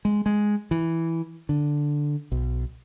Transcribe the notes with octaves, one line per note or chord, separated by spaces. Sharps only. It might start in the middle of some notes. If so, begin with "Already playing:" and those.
G#3
G#3
E3
D3
B1